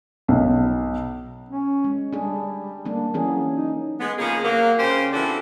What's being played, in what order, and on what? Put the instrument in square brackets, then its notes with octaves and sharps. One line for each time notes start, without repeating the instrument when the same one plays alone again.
[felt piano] B1
[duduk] C#4
[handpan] G#3
[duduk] G3 [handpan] D4 G#4
[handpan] A#3 D4
[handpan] E3 C#4 G#4 [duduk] F#3
[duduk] D#4
[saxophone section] G#3 B3
C#3 F3 A#3 C#4 G#4
F#3 A#3
C#3 C#4 G4 C5
E3 C4 D4 F#4 A4 D5